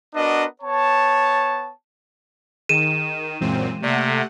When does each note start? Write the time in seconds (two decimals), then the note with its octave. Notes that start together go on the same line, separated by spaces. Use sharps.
0.15 B3 D4 F#4 A#4 D#5
0.62 B3 C#5 A5
2.69 D#3 G#4 D#7 E7
3.41 F#2 A#2 E3 G#3 C4
3.82 C3 A3 A#3 D5 F#5 C#7